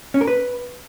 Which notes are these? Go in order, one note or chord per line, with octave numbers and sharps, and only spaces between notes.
C#4
A#4
B4